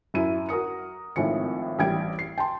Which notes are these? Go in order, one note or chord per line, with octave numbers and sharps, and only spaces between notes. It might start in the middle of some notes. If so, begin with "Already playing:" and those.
F#2 F#3 E4 D#7
F#4 A#4 D#6 C#7
G#1 A2 D#3 F3 G#5 C#7
A1 G3 G5 G#6 D7
C7
G5 A5 C6